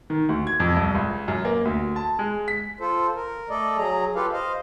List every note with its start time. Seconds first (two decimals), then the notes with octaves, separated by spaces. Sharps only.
0.10 D#3
0.29 D2
0.47 G#6
0.60 F2
0.76 C2
0.95 C#2
1.28 F#2
1.45 A#3
1.65 D2
1.96 A5
2.19 G#3
2.48 B6
2.80 F4 A4 C5
3.16 A#4
3.50 A3 A4 D5 D#5
3.77 F#3 G#4 A#5
4.15 F4 G4 A4 B4 F5
4.33 C5 D#5 F5